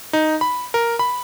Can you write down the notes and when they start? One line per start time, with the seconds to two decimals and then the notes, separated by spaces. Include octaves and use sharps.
0.13 D#4
0.41 B5
0.74 A#4
0.99 B5